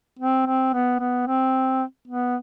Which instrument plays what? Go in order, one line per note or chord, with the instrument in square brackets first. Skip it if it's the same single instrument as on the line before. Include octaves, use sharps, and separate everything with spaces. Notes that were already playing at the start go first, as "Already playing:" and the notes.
[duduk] C4
C4
B3
B3
C4
B3